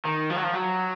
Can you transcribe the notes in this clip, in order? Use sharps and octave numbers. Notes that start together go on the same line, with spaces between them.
D#3
F3
F#3
F3
F#3